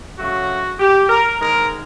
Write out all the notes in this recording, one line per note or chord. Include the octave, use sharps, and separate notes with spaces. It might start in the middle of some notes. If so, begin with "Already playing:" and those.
C#3 F#3 A3 F#4
G4
A#4
G#2 D#3 G#3 A#4